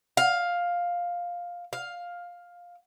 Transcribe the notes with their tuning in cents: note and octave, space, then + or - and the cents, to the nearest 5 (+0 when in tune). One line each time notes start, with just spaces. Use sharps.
F5 +10
F5 +10